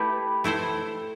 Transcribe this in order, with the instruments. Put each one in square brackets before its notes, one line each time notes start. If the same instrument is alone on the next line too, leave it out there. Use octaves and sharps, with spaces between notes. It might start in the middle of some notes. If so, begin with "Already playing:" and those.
Already playing: [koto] A3 E4 A4 [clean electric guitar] G4 B4
[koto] A3 E4 A4 C5